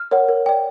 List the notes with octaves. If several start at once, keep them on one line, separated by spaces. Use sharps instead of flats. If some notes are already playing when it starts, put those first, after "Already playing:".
Already playing: F6
A#4 C#5 F#5
A#4
D5 G5